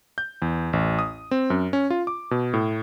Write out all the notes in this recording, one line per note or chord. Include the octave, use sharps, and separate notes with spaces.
G6
E2
A1
D#6
C4
F#2
C#4
F4
D6
B2
A2